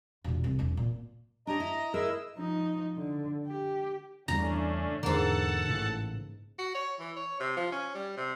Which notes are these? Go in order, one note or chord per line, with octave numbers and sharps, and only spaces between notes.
E1 A#2
C2
E1 F#3
A#2
D4 G4 C#5 D#5 A#5
E4
E4 G#4 A#4 B4 D#5 E6
F3 D#4
D3
G4
E2 G2 C#3 A3 C#4 D4 A#5
E2 G#2 D3 A#3 A4 F#5 A5
A1 A2 C#3
F#4
C#5
E3
C#5
C3
F3
C#4
G3
C3